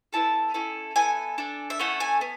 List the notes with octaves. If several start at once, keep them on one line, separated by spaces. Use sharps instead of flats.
B3 E4 A4 A5
C#4 E4 A4
B3 E4 A4 G#5
D4 A4
E5
A3 C#4 E4 A4 F#5
G#5
B3